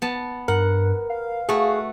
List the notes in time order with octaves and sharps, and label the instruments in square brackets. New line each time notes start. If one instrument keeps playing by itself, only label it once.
[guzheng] B3 A5
[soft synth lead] G2 [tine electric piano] A#4 [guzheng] F#5
[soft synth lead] F5
[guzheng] A3 F#4 [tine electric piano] G#4